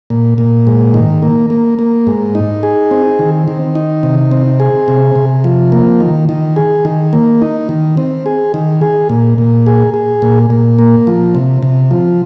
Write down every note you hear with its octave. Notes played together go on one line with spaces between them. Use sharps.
A#2
A#2
G#2
D#3
A#3
A#3
A#3
G#2
D#4
G#4
C4
D#3
D#3
D#4
C3
C4
G#4
C3
C3
F3
A#3
D#3
D#3
G#4
D#3
A#3
D#4
D#3
C4
G#4
D#3
G#4
A#2
A#2
G#4
G#4
A#2
A#2
A#3
F3
C3
C3
F3